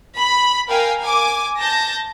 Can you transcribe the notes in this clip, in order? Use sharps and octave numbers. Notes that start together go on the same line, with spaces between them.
B5
A#4 F5 G5 G#5
G#5 D6
A5 G6 A#6